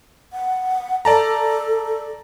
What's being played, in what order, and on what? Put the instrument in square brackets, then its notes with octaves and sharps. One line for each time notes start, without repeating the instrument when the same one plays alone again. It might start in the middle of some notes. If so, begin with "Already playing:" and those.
[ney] F#5
[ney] A4 [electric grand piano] D5 A5 A#5